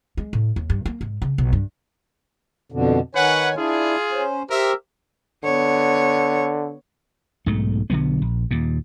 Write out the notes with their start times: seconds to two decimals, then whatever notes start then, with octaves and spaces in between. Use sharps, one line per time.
0.17 G#3
0.33 A2
0.56 D#2
0.70 G2
0.86 A#3
1.01 G#2
1.22 C#3
1.38 B1
1.53 G2
2.72 F2 B2 D3
3.15 D#3 B4 C#5 F#5 G#5
3.57 D4 E4 F4 G#4
4.12 C#4 C5
4.50 G4 A#4 C5 E5
5.44 D3 B3 C#5
7.46 B1 G#2 A3
7.90 B1 D3 F#3 B3
8.22 A#1
8.51 D#2 A#2